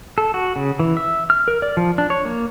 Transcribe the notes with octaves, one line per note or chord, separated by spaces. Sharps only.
A4
F#4
C#3
E3
E5
F6
A#4
D5
F3
D4
C#5
A#3